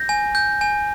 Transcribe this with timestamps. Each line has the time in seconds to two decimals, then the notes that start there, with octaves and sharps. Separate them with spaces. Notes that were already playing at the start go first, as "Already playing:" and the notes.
Already playing: G6 A#6
0.09 G#5
0.35 G6
0.61 G#5